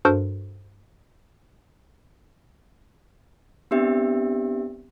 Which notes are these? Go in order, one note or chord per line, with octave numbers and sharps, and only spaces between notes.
G2 D4 F#4 A4 A#4 C5
B3 C4 D4 G4 E5